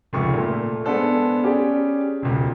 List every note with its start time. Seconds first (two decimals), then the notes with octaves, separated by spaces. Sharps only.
0.13 F1 C#2 C#6
0.33 A#2 A3
0.85 G#3 B3 D4 A4 C5
1.43 C#4 G4 G#4 D5
2.23 E1 C#2